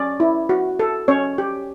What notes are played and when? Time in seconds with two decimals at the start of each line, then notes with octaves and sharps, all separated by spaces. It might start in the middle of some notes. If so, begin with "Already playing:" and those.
Already playing: C#4 D5
0.20 E4
0.49 F#4
0.79 A4
1.08 C#4 C#5
1.38 G4